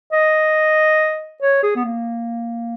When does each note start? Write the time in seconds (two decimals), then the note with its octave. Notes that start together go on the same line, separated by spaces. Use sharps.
0.12 D#5
1.42 C#5
1.63 G#4
1.76 B3
1.84 A#3